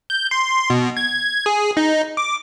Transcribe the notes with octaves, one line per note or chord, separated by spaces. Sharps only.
G6
C6
B2
G#6
G#4
D#4
D6